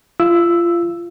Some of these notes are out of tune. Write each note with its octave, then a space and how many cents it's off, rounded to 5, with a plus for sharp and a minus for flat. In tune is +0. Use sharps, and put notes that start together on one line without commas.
F4 -25 E6 +0